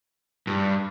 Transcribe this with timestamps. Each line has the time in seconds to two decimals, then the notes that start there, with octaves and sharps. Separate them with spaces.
0.47 G2